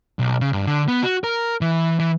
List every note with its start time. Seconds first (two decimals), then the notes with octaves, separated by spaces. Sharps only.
0.19 B1
0.41 C#3
0.53 G2
0.67 D3
0.88 B3
1.03 F#4
1.24 A#4
1.61 E3
1.99 E3